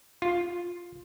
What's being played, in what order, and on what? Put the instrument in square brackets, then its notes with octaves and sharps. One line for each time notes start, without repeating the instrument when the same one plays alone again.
[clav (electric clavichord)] F4